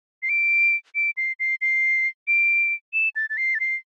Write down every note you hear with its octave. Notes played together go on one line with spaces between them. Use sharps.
C7
D7
D7
C7
C7
C7
D7
E7
A6
A6
C7
A6
C7